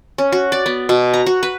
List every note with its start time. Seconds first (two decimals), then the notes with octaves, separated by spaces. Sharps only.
0.18 C#4
0.32 F#4
0.52 D5
0.66 B3
0.89 B2
1.14 A#5
1.26 F#4
1.43 B4